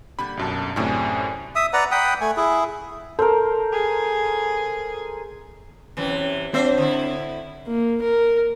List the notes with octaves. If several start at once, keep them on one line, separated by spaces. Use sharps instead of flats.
D3 G3 A#3 B5
B1 F#2 A5
F#2 A2 C3 C#4 D4 G#4
E5 D#6
B4 D5 F#5 A#5
F#5 G5 B5 D#6
A3 G#5
E4 G#4
A4 A#4 C5
G#4
F#2 C3 E3
F#3 C4 D4 C5 E5
D3 E4
A#3
A#4